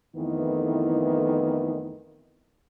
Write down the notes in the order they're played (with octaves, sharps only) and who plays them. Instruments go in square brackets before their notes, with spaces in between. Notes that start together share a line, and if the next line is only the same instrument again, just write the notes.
[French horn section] F2 D#3 E3 A3 B3 E4